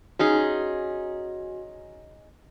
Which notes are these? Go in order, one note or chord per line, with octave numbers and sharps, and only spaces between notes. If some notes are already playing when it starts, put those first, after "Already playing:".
C#4 D#4 F#4 G#4